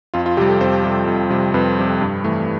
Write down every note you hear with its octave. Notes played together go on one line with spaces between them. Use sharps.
F2 F4
F4
C3 G3 G4
A4
F2 C5
C3 G3
F2
C3 G3
F2 B4
C3 G3
G2
E3 A3